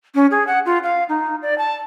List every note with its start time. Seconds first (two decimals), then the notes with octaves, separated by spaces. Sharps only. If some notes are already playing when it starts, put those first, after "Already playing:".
0.15 C#4
0.31 G#4
0.47 F#5
0.66 F4
0.83 F5
1.09 D#4
1.42 D5
1.58 A5